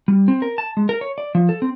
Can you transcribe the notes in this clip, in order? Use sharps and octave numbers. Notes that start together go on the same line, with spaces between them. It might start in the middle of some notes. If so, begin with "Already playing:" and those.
G3
C4
A#4
A5
G#3
A#4
C#5
D5
F3
A4
C4